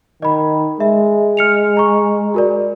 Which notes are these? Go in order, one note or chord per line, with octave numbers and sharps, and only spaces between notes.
D#3 D#5 B5
G#3 E5
F6 C#7 F7
A#5 C#6
F#4 A#4 D5